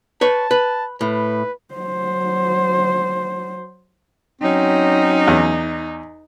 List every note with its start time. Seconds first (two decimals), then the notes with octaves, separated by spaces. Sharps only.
0.21 B4 C#5 A5
0.51 B4
1.01 A2 B4
1.74 F#3 C5
4.42 F#3 C4 C#4 D#4
5.28 E2